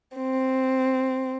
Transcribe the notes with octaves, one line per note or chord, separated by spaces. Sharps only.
C4